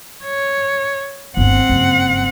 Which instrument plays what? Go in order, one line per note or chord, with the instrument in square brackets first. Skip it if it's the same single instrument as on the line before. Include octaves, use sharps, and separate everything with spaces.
[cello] C#5
[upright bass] G1 D#2 [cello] C4 F#5
[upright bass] F#1 G2